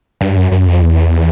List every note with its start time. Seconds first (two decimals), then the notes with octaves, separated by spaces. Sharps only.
0.21 G2
0.36 F#2
0.51 F#2
0.67 F2
0.82 E2